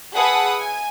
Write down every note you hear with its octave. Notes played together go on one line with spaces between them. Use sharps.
G#4 B4 E5 F#5 A5 D#6
G#5